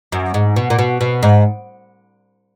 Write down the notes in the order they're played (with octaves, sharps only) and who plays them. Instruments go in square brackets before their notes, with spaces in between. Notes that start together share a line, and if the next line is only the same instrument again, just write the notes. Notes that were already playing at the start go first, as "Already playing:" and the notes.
[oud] F#2
G#2
B2
A#2
B2
B2
G#2